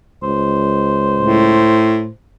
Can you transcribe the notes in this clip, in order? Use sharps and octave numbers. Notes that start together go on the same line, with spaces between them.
C#2 C5
A2